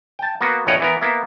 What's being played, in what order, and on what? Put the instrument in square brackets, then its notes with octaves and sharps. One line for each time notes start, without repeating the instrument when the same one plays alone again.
[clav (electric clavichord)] G5 A5
A#3 B3 F#4
A#1 A2 C#5 D#5 F#5 G5
E3 B3 A#4
A#3 B3 E4